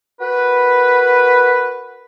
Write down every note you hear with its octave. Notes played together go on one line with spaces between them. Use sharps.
F#4 A#4 B4